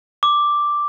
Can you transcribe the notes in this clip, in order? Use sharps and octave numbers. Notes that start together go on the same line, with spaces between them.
D6